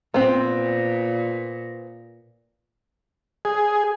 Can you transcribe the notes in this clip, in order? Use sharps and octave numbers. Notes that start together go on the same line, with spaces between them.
A#2 B3 C4
G#4